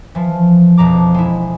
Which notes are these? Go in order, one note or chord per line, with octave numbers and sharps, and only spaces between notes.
E3 F3
E1 F2 A#5 D6
G#3 E4